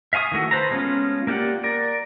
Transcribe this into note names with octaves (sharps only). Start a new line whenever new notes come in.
E5 F5 G#5 C#6 D#6
D#3 E3 A3 F#4
B4 C5 A5 A#5
G#3 A3 B3 C#4 F4
A#3 F4 G4 D5 F#5
A#4 D5